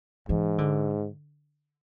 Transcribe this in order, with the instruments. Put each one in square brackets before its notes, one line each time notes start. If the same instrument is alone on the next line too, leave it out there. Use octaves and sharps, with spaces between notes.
[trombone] G#2 [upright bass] E3
[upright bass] D3